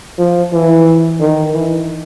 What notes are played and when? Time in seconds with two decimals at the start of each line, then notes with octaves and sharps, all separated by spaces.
0.18 F3
0.52 E3
1.20 D#3
1.54 E3